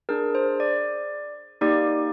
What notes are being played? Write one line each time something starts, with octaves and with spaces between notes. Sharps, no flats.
D4 G#4 A#4
C5
D5
A#3 D#4 G4 D5